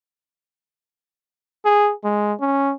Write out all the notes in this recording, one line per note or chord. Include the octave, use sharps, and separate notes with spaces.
G#4
G#3
C#4